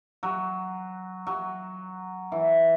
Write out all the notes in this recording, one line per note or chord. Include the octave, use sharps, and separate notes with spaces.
F#3
F#3
E3